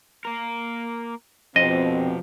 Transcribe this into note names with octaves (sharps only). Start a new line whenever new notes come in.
A#3 A#4
F2 B2 F3 C4 F4 G4 D#5